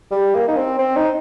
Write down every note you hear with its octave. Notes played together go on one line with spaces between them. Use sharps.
G3
A#3
D#4
C4
C4
D#4